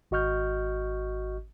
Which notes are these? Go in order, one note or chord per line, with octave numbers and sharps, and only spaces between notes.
G#1 F#4 D#5 C#6 F6 G6